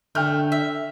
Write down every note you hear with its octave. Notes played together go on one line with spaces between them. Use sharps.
D3 A3 G5 F6 G6
E5